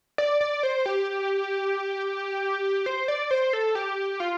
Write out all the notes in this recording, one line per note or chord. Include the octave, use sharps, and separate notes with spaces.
D5
D5
C5
G4
C5
D5
C5
A4
G4
F4